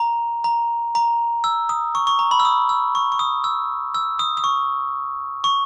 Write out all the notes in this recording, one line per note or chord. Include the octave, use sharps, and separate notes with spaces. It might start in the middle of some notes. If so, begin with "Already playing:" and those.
Already playing: A#5
A#5
A#5
E6
D#6
C#6
C#6
A#5
B5
E6
D#6
E6
C#6
C#6
D#6
E6
E6
D#6
D#6
C#6
C#6